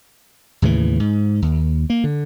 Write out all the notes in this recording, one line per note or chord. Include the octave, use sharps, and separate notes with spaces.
D#2 A2 C#3 E3
G#2
D#2
A#3
D3